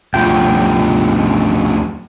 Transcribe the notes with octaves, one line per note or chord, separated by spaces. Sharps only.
D2 F3 G5